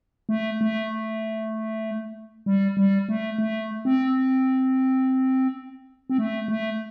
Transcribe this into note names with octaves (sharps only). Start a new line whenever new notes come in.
A3
A3
G3
G3
A3
A3
C4
C4
A3
A3